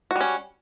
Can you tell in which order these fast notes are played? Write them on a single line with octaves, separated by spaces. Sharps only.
F#4 G3 C#4